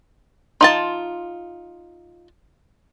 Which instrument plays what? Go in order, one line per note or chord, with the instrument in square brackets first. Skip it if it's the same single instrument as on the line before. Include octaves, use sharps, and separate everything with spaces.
[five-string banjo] D#4 F4 A5 [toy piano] C6